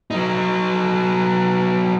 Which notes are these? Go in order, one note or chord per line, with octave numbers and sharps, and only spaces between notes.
F#3 D#4